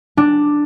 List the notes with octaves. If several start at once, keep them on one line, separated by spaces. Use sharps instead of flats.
D4